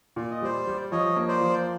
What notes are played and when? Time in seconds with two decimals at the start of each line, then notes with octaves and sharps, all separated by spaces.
0.16 A#2 D5
0.31 D#5
0.42 G3 C5 D5
0.67 G3
0.91 F3 C#5 D#5
1.16 A#3
1.29 C5 D5
1.41 F3